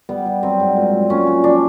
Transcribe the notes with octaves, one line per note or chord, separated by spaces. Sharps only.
G3 B3
G3
F#3 C4
G#2
A#2
F#3
A#2 C#4
A#2
F3 D4